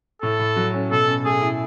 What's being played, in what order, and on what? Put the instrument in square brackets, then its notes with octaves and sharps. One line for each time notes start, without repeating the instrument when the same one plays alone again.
[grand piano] A2 [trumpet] A4
[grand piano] A2
F#3
C#4
[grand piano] B2 [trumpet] A4
[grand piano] C#4
[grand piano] A3 [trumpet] G#4
[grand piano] E4